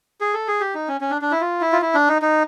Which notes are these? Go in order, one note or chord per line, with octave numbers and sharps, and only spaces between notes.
G#4
A4
G#4
G4
D#4
C#4
C#4
D4
D4
E4
F4
E4
F4
E4
D4
D#4
D#4